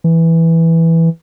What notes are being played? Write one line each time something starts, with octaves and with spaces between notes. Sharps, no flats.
E3